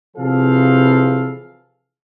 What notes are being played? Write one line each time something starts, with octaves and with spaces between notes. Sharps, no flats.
C3 E3 F3 G#4 A4 F5